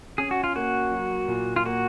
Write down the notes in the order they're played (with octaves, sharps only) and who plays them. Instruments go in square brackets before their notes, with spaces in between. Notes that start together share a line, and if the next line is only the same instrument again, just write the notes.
[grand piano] C#4 [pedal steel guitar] G#4
[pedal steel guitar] F#4
F4
[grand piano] A#3 [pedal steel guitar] F#4
[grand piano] F#3
A#2
[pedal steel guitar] F4
[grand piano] A#3 [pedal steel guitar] F#4